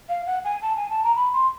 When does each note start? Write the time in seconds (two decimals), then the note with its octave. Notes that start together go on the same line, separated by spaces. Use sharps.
0.09 F5
0.26 F#5
0.44 G#5
0.62 A5
0.76 G#5
0.89 A5
1.03 A#5
1.15 B5
1.33 C6